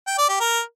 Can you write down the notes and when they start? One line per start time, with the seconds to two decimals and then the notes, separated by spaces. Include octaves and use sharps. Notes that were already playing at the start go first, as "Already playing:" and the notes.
0.07 G5
0.18 D5
0.29 G4
0.40 A#4